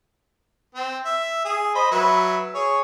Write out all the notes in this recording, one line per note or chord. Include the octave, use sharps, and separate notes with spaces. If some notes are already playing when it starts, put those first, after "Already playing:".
C4
E5
G#4
C5 D#5 B5
F#3 B4 E5
G#4 C#5